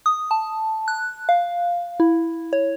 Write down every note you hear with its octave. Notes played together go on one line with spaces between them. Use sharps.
D#6
A5
F#6
F5
E4
C#5